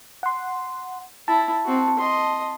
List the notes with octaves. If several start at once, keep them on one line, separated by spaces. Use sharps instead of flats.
F#5 C6
E4 A5
C4 F#4
D#5 C6